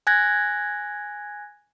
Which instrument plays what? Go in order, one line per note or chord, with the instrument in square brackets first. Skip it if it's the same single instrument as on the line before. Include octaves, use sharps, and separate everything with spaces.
[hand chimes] G#5 F#6 G#6 A#6